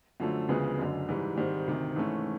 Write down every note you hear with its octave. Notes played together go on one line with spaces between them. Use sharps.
F#2 D3 F3 A3
D2 C#3 F3 G#3 B3
F#1 F#2 D3
G#2 E3 G3
G#2 D#3 G3 C4
D2 C3 D#3
G#2 E3 A3 C#4